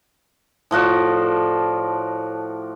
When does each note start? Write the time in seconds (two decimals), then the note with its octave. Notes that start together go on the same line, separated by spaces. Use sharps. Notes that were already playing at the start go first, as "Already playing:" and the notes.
0.71 A2 F3 F#4 D5